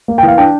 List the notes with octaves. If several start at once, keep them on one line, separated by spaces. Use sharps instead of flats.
A#3
E3 G5
F5
D4 G5